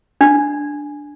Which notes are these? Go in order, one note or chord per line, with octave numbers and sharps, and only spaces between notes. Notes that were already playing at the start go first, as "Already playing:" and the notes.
D4